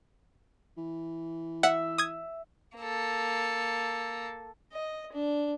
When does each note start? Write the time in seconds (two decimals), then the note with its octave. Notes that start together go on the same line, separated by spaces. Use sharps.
0.77 E3
1.63 E5 F#5
1.98 D#6 G#6
2.78 A#3 A4
4.72 D#5
5.13 D4